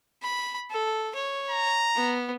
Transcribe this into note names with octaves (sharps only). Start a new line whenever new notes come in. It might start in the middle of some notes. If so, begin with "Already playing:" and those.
B5
A4
C#5
A#5
B3